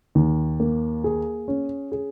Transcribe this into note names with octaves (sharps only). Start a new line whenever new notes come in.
D#2
A#3
G#4
C#4
G#4